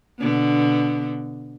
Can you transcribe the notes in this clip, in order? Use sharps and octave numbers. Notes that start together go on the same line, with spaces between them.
B2 D3 B3